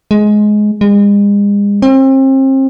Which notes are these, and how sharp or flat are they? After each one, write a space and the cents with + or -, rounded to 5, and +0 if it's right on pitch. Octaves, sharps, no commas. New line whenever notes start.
G#3 +15
G#3 -40
C4 +35